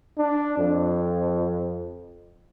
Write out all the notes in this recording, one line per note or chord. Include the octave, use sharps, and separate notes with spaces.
D4
F2